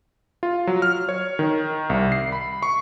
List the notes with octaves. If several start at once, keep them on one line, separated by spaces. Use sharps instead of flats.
F4
F#3
F6
C#5
D#3
C2
C7
B5
C#6